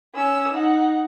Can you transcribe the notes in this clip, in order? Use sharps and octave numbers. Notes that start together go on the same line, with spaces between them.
C#4 E6
D#4 F#5